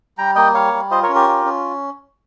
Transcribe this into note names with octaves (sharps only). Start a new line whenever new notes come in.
G3 G5 A#5
A#3 D#5 G5
G3 C#5 F5
G3
F4 C5 D#5
A#4 C#5
C#4
G4 A#4
F4
C#4